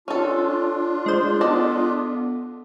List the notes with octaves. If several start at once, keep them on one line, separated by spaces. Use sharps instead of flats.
C#4 D4 F4 A4
G#3 C5
B3 A4 D5 D#5